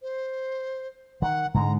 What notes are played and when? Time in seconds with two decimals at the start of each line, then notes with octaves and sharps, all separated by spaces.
0.02 C5
1.22 D#3 F#5
1.54 G#2 D3 G#3 A#5